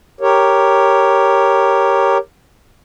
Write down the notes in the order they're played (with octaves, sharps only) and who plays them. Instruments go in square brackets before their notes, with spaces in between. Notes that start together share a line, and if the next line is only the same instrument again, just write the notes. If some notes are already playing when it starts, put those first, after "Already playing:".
[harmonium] G4 A#4 C#5